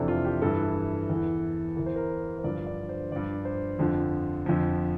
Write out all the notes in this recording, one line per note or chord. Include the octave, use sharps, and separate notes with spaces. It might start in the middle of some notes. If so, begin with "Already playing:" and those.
Already playing: F2 C3 E3 D4 A4
F4
G4
G2 E3 A4
E2 E3
E2 E3 A#4
C5
A#4
C5
G2 D3 F3 D5
D5
C5
G2 F3 D5
C5
F2 D3 F3
F2 D3 F3